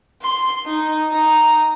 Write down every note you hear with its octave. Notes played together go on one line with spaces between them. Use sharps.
C6
D#4
D#4 A#5